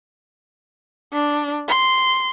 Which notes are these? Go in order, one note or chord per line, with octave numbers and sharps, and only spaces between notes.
D4
C6